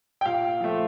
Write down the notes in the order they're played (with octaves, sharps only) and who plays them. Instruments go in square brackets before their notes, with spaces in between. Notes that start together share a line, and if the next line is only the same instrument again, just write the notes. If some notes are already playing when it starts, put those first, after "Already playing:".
[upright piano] G5
A#2 F5
F3 A3